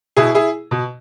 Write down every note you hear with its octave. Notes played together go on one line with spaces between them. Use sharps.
B2 E4 G#4
E4 G#4
B2